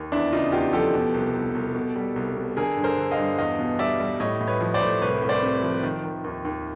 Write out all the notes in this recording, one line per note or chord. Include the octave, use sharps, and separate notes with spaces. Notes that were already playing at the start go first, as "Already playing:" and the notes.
Already playing: D#2
E2 D4 E4
C#3 D#4 F4
E2 F4 G4
F3 G4 A4
B2
C2
C2
C2
B2
G3
C2
B2
D3 G#4 A#4
G2
A#4 C5
D3
D#5 F5
G2
E2 D#5 F5
B2
G3 D5 E5
G3
A2 C#5 D#5
A2
B4 C#5
F3
C5 D5
A2
C2 B4 C#5
C2
C5 D5
C3
F3
D#3
D#3
D#2
D#2